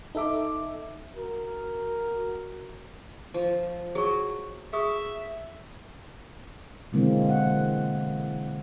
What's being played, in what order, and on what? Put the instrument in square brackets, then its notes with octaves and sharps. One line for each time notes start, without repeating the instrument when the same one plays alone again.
[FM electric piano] D#4 A4 E5 D6
[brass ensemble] F#4 A#4
[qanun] F3
[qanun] F#3 [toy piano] G#4 C#6
[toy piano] G#4 C#6 D#6 [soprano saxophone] E5
[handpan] B2 D3 E3 G#3 A#3 C4
F#5